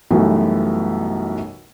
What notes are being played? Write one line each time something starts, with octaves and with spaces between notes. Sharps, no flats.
B1 F#2 B2 E3 G3 A3